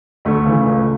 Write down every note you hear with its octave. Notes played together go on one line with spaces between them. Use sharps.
D2 A3
C#3 E3
C#2